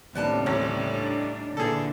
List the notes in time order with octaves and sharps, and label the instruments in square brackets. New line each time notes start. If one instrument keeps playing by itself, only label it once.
[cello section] D#2 C#3 C4 [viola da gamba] A2 G3 [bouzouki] B3 D4 A5
[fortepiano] A1 [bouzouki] C#4
[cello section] D4 D#4
[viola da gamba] A#2 E3 D4 [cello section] D3 [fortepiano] G#4 A4